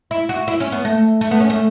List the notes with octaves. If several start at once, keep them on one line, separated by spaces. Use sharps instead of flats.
E4
F#4
E4
C#4
B3
A3
A3
B3
C#4
A3